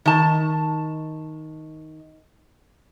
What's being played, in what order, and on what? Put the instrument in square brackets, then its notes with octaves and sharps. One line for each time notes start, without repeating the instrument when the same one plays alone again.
[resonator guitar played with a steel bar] D#3 A5